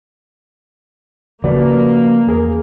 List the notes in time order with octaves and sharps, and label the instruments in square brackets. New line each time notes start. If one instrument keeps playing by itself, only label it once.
[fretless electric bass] C#3 F3 A3 [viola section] A#3 [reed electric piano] F#4 B4 D5
[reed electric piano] E2 G#4 A#4